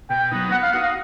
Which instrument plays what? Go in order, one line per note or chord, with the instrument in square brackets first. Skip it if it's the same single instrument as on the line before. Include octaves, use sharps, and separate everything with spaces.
[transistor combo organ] B2 [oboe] G5
[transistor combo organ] F#3 B3 D#4
[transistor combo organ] B3 [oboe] F#5
[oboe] F5
[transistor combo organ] D#4 F#4 [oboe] F#5
[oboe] F5